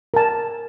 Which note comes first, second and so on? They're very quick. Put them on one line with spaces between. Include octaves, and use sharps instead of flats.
A#4 A5 G#5